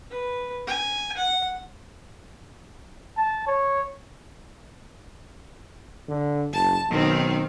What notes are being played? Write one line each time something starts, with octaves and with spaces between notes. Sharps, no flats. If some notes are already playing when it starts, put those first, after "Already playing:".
B4
G#5
F#5
A5
C#5
D3
F#1 A5
B1 D#3 C4